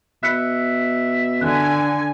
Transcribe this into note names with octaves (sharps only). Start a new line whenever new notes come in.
B2 E5 F#6 B6 C#7
D3 G#5 F#6